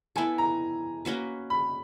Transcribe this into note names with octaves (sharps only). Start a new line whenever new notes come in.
B3 E4 A4 G#5
A#5
A#3 C#4 F#4 B4
B5